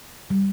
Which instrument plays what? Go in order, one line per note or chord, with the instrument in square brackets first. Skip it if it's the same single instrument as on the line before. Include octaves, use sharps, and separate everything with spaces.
[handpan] G3